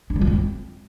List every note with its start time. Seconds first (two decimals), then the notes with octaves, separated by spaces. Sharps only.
0.10 D4
0.16 G3
0.21 F4
0.27 C#4
0.33 C4